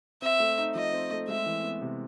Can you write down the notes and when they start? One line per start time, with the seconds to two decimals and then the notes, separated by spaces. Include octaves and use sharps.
0.22 C4 E5
0.40 A3
0.58 D#4
0.75 F3 D#5
0.93 C4
1.11 A3
1.29 G#3 E5
1.46 E3
1.64 B3
1.82 C3